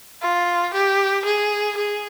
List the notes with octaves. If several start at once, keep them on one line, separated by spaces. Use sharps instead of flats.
F4
G4
G#4
G#4